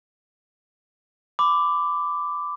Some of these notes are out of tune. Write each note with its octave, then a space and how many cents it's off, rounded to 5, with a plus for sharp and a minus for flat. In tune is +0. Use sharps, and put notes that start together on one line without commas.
B5 +25 D6 +0